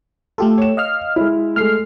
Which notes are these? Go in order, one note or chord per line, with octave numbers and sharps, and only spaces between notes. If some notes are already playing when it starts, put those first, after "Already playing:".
A3 F4 G4 A4
C#5 E7
D#5 F5 F6
G#3 E4
G#3 A3 F6 C7